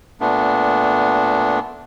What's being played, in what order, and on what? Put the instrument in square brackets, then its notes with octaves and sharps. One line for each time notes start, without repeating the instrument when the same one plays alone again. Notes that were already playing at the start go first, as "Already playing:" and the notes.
[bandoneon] A#2 A3 B3 D4